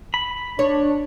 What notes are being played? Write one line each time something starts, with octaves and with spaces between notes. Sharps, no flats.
B5
D4 C#5